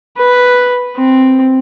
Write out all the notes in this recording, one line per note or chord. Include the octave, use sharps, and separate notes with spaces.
B4
C4